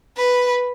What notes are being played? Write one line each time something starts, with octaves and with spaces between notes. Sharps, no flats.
B4